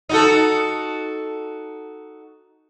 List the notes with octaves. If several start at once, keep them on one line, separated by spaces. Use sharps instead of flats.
D#4 F#4 A4